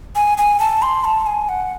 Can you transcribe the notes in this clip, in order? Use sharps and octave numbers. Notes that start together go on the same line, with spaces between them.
G#5
G#5
A5
C6
A5
G#5
F#5